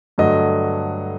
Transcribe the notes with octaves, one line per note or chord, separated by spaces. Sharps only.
G2 D3 F#3 A3 D#5